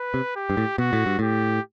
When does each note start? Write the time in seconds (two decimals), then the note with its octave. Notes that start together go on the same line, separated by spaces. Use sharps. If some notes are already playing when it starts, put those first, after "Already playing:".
Already playing: B4
0.14 C3
0.35 G4
0.50 G2
0.57 A2
0.78 B2 F#4
0.93 A2
1.06 G2
1.19 A2 G4